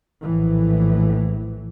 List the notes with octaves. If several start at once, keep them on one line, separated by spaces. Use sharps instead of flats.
A#1 A2 E3